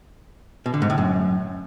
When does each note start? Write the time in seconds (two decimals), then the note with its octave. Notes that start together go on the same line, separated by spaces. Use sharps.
0.66 B2
0.74 D3
0.82 G#2
0.90 A2
0.98 F#2